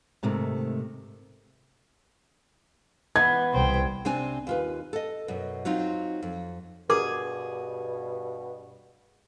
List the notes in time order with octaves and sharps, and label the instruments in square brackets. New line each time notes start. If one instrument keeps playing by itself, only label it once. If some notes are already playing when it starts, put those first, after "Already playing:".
[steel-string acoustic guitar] G#2 C3 D#3 A3
[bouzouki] E3 B3 [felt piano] G#6
[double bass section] C2 [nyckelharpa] C5 G5
[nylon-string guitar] C3 C4 D4 G#5
D#2 F4 B4
A4 D#5
F#2 B2
F#3 C4 D#4 F4
F2
[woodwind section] G2 B2 [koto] G#4 [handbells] A#4 D6